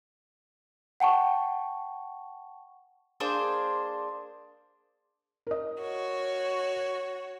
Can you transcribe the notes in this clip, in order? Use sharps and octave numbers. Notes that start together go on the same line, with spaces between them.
F#5 G5 A5 C#6
A#3 D4 G#4 C5
A#4 D#5
F#4 C#5